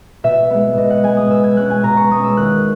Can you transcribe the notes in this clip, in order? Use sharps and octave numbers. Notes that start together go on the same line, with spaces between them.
B2 E5
G#3 B3
B2 D#5
F#5
G#3 B3 G#5
D#6
B2 E6
G#6
G#3 C#4 F#6
G#5
B2 A#5
C#6
G#3 C#4 D#6
E6
D#2 F#6